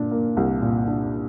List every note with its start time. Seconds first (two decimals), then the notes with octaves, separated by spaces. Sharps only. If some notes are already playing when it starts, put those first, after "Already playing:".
Already playing: A#2 D4
0.11 A#3
0.37 C2
0.62 A#2
0.88 D4